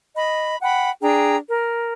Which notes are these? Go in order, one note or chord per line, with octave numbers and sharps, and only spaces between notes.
D#5 B5
F#5 G5 B5
D4 G#4 G5 A#5
A#4